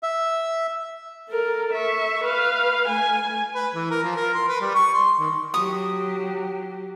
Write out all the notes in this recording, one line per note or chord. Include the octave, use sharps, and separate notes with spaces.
E5
A4 A#4
E5 C#6
B4 F5
A3 G#5
B4
E3
A#4
F3
A#4
C6
B4
G3
C#6
C6
D#3
F#3 G4 C#6 D#6